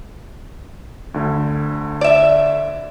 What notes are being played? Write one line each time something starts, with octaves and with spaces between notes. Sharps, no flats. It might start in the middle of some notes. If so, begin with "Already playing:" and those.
D2 D3
D5 E5